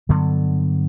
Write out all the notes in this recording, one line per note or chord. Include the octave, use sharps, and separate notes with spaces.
G2 D3 F#3 B3